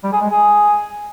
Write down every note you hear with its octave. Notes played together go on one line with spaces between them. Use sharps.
G3
G#4
G#3
G#4